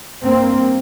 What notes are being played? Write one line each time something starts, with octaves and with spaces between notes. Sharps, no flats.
G2 A#3 C4